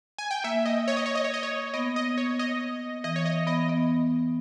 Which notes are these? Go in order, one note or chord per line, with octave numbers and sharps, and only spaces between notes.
G#5
G5
A#3 E5
D#5
C#5
D#5
C#5
D#5
C#5
D#5
C#5
B3 D#5
D#5
C#5
D#5
E3 D#5
C#5
D#5
B3 D#5
B3